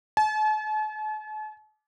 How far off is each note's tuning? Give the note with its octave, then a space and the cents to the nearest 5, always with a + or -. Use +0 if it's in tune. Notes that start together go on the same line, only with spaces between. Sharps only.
A5 -45